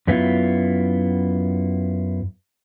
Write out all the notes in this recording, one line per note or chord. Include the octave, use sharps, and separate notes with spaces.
F#2 B3 E4 F4